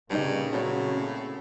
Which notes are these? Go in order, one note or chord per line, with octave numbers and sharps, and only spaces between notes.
G2 A#2 C#3 G3 D#4 D#5
A2 F#3 C4 F#4